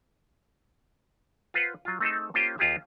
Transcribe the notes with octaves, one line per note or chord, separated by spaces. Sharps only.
F4 B4 C5 F#5
F#3 F4
A3 C4 D#4 G#4 A4
A#3 C#4 F4 G4 C5 G5
D#2 F4 G4 G#4 E5